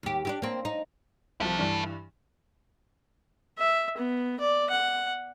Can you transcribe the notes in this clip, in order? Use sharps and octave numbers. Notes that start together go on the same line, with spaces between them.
D#2 G4
D4 E4 G4
A#3 C4
D#4
C2 F3 E4 A4
G2 E3 D4
E5
B3
D5
F#5